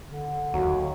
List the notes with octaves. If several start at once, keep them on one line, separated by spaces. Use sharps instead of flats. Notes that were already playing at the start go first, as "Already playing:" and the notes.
D3
D#2 F#3